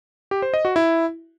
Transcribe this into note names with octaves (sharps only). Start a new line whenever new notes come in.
G4
C5
D#5
F#4
E4